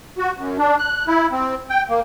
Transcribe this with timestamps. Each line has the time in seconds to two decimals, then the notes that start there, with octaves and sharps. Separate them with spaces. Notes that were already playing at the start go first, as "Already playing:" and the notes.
0.18 F#4
0.37 F#2
0.58 D4
0.79 F#6
1.07 E4
1.32 C4
1.70 G5
1.89 A#3